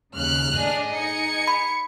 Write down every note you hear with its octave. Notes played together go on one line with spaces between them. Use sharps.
D#2 C#3 F6 F#6
A2 D4 G#4 D#5
D#4 G#6 C#7
B5